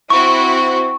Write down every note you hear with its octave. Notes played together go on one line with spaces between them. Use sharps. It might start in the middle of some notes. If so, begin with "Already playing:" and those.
C4 E4 F#4 C#6